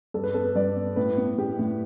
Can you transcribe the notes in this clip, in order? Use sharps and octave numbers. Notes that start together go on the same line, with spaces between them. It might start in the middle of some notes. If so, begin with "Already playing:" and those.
G2 A4
B4
B3 A4
B4
G2 D5
B3
A2 B4
B3
A2 G4
A2